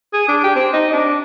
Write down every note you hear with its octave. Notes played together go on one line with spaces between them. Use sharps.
G#4
D4
G4
C4
D#4
D4